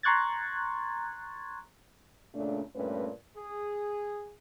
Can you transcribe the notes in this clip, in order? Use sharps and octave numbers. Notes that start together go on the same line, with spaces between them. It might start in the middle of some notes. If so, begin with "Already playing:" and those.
A#5 C6 C#6 F#6 G#6 A6
A#2 C#3 A3 D4
G2 A#2 A3 C#4 B4
G#4